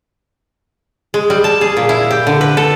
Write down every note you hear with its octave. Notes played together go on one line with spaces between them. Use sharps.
G#3
G3
A5
G#4
A#2
E4
G4
D3
B4
A4